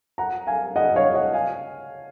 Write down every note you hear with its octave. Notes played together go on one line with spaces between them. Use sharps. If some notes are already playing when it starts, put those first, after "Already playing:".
F#5 A#5
F5 G#5
D#5 F#5
C#5 F5
D#5 F#5
F5 G#5